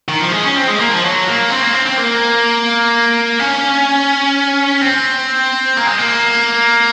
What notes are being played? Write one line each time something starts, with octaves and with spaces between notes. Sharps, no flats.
D#3
F3
G#3
C#4
C4
G#3
A#3
F3
F#3
A#3
C4
A#3
C4
C4
A#3
C#4
C4
A#3
G#3
A#3